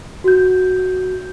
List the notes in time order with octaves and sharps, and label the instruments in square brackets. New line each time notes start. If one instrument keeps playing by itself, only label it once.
[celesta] F#4 G6